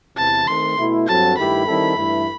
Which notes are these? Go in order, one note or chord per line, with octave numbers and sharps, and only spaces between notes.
E2 C3 E3 A5
D#3 A3 C4 C6
B2 A3 E4
G2 F#3 C4 F#4 A4 A5
G2 D#3 A3 E4 G4 B5
D#3 G3 C4 E4 A4
G2 E3 A3 E4